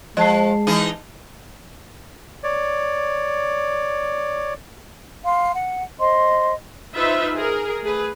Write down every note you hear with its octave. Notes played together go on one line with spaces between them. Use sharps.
F3 G#3 D#5 A5 C7
E3 D#4 G#4
C#5 D5
F5 C6
F#5
C5 D#5 C6
D#4 F4 B4 C5 E5
G#4 A#4
A3 G#4 B4